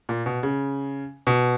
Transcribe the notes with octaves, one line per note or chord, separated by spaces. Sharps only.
A#2
B2
C#3
B2